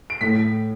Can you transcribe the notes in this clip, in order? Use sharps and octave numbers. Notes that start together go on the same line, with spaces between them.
D7
A2 B6